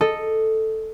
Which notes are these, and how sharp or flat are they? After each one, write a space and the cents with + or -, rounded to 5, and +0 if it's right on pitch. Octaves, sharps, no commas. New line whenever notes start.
A4 +0 D#5 -5